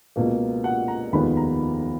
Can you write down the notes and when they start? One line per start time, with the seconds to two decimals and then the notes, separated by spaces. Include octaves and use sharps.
0.16 C#2 B2 A#3
0.64 F#5
0.88 A#5
1.12 F1 D#2 D#3 G#3 B3 B5
1.37 A#5